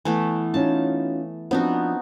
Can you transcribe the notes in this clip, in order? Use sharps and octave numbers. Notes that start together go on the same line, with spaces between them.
E3 A3 B3
C#4 D#4 F4 A5
F3 B3 C4 D4 D#4 F#4